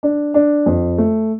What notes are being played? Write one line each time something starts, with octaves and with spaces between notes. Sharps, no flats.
D4
D4
F2
A3